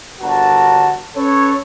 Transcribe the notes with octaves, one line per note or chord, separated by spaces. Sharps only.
G1 D3 F#4 A#4 A5
C#4 A4 B4 C#5